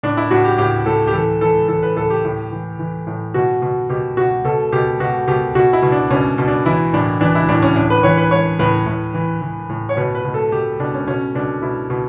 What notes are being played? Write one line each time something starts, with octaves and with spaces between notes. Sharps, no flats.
A2 D4
E4
A2 F#4
G4
A2 G4
A2 A4
G4
E3 A4
E3 A4
E3 A4
B4
A2 A4
G4
A2
E3
E3
A2
B2 F#4
B2
B2 G4
B2 F#4
B2 A4
B2 G4
B2 F#4
B2 G4
B2 F#4
E4
B2
D4
B2 C#4
B2
D4
E3 E4
A2 D4
E3 D4
E4
A2 D4
C#4
A2 D4
B4
E3 C#5
B4
E3 C#5
A2 B4
A2
E3
E3
A2
C#5
B2 B4
B4
B2
A4
B2 G4
B2 D4
C#4
B2 C#4
B2 D4
B2 E4
B2